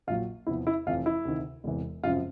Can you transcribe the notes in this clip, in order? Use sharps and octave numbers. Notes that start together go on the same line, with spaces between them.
A#1 A#2 F#3 F4
E2 C3 F3 E4
E4
F1 F2 C3 E3 F4
E4
D2 C3 D#3
E1 E2 C3 E3
G#1 F#2 C#3 F3 F4